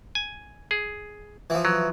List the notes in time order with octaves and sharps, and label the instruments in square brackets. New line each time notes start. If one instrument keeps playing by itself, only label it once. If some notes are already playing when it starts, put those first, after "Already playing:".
[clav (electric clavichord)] G#5
G#4
[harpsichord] E3 F3
[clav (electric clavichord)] F#3